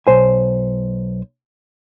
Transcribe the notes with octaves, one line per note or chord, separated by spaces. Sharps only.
B1 C5 G#5